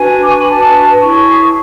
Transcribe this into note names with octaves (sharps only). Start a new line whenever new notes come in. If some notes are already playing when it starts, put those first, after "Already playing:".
Already playing: D4 F#4 B4 G#5
D6
C#6
B5
D4 F#4 B4 A5
E4 G#4 C#5 C#6